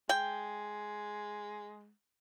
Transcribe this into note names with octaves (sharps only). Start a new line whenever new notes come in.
G#3 G5